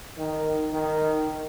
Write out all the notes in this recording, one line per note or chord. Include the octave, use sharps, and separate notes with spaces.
D#3
D#3